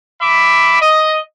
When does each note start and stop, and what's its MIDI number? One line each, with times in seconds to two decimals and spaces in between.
0.21 0.80 76
0.21 0.80 83
0.21 0.80 86
0.82 1.18 75